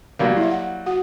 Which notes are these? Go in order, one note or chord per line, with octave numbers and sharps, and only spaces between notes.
F#3 G3 A#3
E4 E5
F#5
F#4 F#5